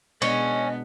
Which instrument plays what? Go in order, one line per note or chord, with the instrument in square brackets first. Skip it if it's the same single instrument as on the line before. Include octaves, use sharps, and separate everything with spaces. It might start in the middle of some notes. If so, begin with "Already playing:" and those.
[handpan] B2 G#3 D4 [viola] B3 [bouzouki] C#4 [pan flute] D#5